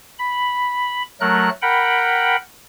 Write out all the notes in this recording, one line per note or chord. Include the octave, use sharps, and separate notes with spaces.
B5
F#3 A3 A#4 F#6
A#4 F#5 G5 B5